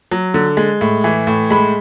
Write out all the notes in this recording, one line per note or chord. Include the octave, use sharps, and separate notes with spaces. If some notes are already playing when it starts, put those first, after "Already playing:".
F#3
D3
G#3
A2
E3
A2
G#3 B5